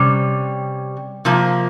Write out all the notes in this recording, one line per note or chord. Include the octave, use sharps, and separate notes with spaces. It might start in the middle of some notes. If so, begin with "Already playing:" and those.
Already playing: C3 G3 C#4
C3 F3 A#3